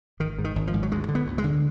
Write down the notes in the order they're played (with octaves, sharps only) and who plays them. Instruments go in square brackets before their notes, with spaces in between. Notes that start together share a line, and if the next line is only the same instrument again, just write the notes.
[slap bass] G#1 D#3
G#2
D#3
G#1
F3
G#2
F#3
D2 G#3
D3
B3
D2
G#3
D3